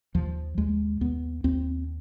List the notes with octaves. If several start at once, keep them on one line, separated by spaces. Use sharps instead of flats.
D#2 F3
D#2 G#3
D#2 B3
D#2 C4